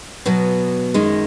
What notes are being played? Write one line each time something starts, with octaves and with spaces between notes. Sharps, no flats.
B2 F#3 B3
F#2 D#3 G#3